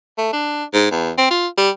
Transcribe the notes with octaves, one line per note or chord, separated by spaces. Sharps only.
A3
D4
G#2
E2
C4
F4
G3